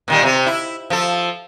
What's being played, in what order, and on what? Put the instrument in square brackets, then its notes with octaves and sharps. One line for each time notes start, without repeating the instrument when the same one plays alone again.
[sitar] A#2 D#3 G3
C3 C4
E4
F3 A4